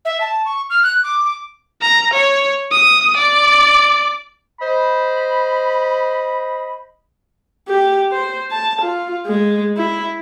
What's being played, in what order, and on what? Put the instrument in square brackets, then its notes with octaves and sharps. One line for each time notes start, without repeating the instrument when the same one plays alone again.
[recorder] E5
A5
C#6
F6
F#6
D6
D6
[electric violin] A#5
C#5
D#6
D5
[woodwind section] C5 D#5 B5
[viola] G4
C5
A5
F4
G#3
E4